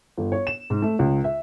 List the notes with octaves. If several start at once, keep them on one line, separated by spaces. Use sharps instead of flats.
G1
C#5
E7
G#2
A3
C#2
E5